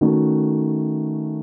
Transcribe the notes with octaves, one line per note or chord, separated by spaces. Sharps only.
D#3 A3 C#4 F#4 A4